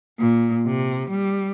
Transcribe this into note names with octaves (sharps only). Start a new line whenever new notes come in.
A#2
C3
G3